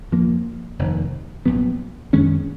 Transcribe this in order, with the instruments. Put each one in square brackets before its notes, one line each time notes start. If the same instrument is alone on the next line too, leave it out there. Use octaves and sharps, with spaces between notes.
[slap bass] F2 F3 A#3
F1 D#2 D#3
A#1 A#2 F#3 B3
F#2 D#3 G#3 C#4